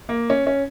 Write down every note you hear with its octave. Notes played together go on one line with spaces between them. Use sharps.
A#3
C#4
C#4